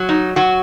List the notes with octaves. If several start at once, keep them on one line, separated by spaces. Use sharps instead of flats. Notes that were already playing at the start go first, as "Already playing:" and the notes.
Already playing: F#3
D#4
F#3 F#4